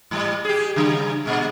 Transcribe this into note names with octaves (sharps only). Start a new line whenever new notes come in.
G#2 G3
G4 G#4
C#3 G3
A#2 G#3